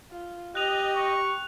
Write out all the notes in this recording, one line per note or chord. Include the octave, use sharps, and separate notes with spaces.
F4
G4 D#5 F#6 F7
C#6